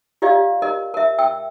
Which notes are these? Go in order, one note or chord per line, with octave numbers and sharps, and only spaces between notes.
F4 G4 D5 D#5 F5
A#4 D#5
A#4 E5
G5 E6